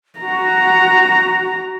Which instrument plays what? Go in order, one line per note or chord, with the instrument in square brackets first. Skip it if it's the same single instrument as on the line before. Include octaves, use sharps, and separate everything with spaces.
[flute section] F#4 [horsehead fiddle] A#5